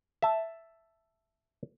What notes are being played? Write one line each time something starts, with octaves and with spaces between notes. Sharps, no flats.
E5 A5